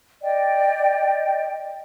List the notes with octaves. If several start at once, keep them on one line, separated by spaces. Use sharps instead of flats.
D5 D#5 G5